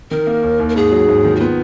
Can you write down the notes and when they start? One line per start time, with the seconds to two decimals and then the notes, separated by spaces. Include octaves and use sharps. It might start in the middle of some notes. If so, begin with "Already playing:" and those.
0.11 D#3 A#4
0.27 A#3
0.43 D#2
0.60 D#2
0.69 A#4
0.76 G#2 G#4
0.91 F#3
1.08 G#2
1.25 D#3
1.35 F#4
1.40 B3 F4